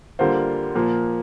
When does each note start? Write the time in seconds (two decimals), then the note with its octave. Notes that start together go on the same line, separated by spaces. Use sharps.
0.19 D3 G3 A#3 F4 C5
0.75 A#2 F3 A#3